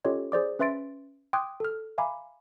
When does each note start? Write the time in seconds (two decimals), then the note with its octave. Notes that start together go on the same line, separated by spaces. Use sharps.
0.04 C#4 F4 G4 A4 C#5 D#5
0.32 G#4 C5 D5 D6
0.59 C#4 B4 E5 C6 A6 D7
1.33 G5 C6 D6 D#6 F#6 G#6
1.60 A4 F6
1.98 E5 F5 G#5 A#5 B5 D6